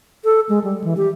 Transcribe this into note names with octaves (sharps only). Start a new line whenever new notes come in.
A4
G#3
G3
E3
G4